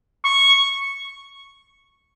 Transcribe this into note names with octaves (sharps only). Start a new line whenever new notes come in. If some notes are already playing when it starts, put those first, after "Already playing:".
C#6